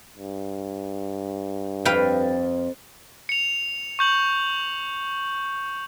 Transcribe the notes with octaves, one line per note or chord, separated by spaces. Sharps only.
G2
F2 B4 F5 G5
C#7 F7
C#6 G6 F#7